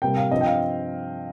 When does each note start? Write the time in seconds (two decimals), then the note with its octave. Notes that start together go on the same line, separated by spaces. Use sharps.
0.02 C3 G3 A#3 G5
0.17 F5
0.31 G2 F3 C4 D#5
0.41 G5
0.46 F5